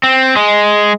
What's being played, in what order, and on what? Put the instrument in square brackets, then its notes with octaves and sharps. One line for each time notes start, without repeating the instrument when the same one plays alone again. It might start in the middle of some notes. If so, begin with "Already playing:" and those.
[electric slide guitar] C4
G#3